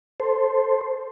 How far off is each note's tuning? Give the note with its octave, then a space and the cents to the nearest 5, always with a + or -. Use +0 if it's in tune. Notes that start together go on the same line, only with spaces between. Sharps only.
A4 +0 C5 +0